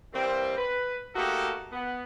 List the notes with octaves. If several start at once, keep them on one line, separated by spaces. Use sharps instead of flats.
E3 G3 A#3 C4
B4
A3 A#3 D#4 F#4 G4 A4
B3